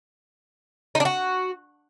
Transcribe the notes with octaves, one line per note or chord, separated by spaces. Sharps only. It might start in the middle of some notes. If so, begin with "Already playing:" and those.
D#4
D4
F#4